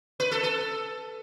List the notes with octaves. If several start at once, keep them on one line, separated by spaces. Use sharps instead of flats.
B4
A4
A4